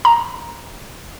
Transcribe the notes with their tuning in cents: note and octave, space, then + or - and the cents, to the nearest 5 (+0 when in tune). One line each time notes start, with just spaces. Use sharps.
A#5 +5